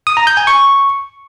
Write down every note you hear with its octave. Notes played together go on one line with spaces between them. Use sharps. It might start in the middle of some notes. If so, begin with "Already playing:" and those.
D#6
A#5
G6
G#5
C#6